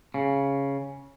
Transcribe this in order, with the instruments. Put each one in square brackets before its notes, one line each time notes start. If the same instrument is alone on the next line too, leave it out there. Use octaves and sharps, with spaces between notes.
[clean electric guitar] C#3